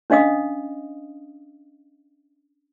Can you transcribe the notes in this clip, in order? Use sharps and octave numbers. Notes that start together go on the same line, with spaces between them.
C#4 D4 D#5 F5 D#6